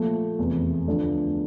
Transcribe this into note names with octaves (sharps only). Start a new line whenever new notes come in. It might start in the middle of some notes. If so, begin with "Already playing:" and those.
Already playing: A#2 F3 A3
F1 E2 C3
D2 D3 F3 A3 D4